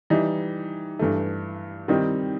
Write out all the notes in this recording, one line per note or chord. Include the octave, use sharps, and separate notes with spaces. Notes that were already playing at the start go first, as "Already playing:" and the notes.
E3 G3 D#4
G2 E3 A3
D#3 G3 C4 D#4